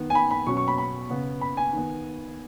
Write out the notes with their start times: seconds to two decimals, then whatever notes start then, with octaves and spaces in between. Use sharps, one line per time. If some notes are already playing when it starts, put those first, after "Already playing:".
Already playing: D#3 B3
0.10 G#5
0.15 B5
0.31 B5
0.47 B2 F#3 C#4 C#6
0.57 C#6
0.68 B5
0.78 B5
1.10 C#3 B3
1.41 B5
1.57 G#5
1.73 D#3 B3